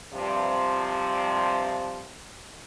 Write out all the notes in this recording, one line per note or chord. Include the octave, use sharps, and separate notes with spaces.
G2 C3 F3